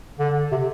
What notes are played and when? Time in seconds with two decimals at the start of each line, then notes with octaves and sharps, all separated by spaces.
0.19 D3
0.52 C3